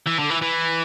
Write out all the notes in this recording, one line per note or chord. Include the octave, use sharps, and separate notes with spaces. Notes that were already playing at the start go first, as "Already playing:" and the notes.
E3
D3
E3
E3